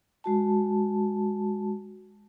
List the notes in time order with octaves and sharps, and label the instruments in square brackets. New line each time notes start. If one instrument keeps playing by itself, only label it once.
[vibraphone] G#3 F#4 A5